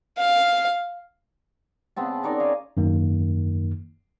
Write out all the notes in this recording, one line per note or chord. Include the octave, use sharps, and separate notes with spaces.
F5
C#3 B3 C4 A5
C#4 D#4 A#4 D5
F5 G#5
F#2 D#3 A#3